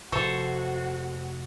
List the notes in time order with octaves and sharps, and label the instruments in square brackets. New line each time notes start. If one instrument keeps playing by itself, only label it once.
[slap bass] F1 [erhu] F#4 [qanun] A4 C5 C#5 [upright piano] C#6